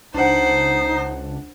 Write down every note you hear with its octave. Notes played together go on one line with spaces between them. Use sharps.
C#2 D4 D#4 C5 F#5